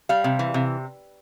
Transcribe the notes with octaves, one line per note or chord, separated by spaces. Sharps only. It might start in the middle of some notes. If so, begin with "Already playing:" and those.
G3 F5
C3
E3
C3